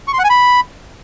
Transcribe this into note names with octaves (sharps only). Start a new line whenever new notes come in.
C#6
C6
F#5
G#5
B5